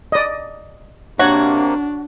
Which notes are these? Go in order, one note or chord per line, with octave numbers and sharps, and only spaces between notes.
D5 D#5
C3 A#3 D4 F#4 C#5 F#5